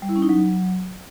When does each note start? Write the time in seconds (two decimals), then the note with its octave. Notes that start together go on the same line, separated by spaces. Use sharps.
0.02 G3
0.09 E4
0.16 C#4
0.22 D#4
0.29 F#3